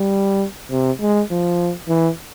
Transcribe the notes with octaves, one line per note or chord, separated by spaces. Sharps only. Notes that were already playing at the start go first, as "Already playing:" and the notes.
Already playing: G3
C3
G#3
F3
E3